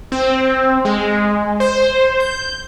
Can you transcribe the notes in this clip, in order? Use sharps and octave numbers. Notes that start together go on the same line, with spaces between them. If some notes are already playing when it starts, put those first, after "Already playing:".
C4
G#3
C5
G6